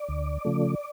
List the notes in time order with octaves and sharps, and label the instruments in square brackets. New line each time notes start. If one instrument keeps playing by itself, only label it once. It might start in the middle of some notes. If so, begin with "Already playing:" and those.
Already playing: [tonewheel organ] D5
D2
C#3 F3 A3